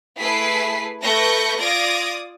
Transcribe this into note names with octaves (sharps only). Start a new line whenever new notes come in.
A3 E4 G#4 B4 B6 C7
A3 B4 C#6 F#6 G6 A#6
F4 D5 D6 D#6 G#6 A#6